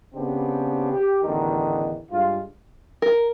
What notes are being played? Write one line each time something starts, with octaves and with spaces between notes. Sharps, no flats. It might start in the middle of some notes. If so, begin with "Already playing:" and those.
C#3 B3 C4 D4 G4
G4
A1 E2 D3 D#3 D#4
G2 G#3 F4
A#4